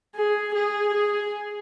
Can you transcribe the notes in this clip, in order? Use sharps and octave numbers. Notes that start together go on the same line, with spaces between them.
G#4
G#4
G#4